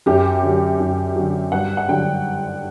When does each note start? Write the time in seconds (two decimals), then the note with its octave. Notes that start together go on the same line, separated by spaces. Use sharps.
0.06 F#2 G4
0.42 D3 F#3
0.80 F#2
1.15 D3 F#3
1.52 G2 F#5
1.77 F#5
1.88 D3 F#3 G5